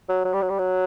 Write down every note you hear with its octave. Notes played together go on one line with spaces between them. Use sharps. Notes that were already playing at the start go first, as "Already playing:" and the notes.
F#3
F#3
G3
F#3
G3
F#3